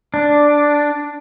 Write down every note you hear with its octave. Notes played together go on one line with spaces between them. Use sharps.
D4